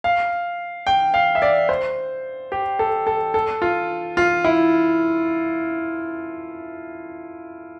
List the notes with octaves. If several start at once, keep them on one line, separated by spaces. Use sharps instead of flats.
F5
G5
F5
E5
D5
C5
G4
A4
A4
A4
F4
F4
E4